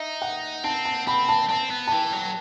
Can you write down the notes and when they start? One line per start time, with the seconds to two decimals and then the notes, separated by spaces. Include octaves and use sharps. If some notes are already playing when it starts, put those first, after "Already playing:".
Already playing: D#4 E5
0.22 F#5
0.64 C4 A5
0.85 A5
1.07 C4 B5
1.29 A5
1.49 C4 A5
1.71 B3
1.87 A5
1.92 E3 G5
2.13 F#3